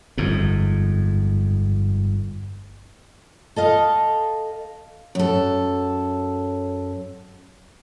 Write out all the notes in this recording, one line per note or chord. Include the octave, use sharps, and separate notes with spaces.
G1 F2 G#2
A4 D#5 F5
F#2 A4